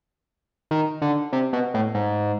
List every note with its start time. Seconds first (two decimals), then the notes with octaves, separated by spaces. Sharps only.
0.71 D#3
1.02 D3
1.33 C3
1.53 B2
1.74 A2
1.95 G#2